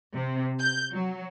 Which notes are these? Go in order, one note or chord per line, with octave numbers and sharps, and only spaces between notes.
C3
G6
F#3